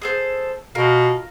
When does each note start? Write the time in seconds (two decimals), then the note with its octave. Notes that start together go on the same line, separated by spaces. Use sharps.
0.02 G#4 A4 C5
0.75 B2 F4 A#4